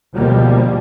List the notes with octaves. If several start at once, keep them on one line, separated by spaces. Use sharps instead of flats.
D2 B2 F3 G3 G#3 A#3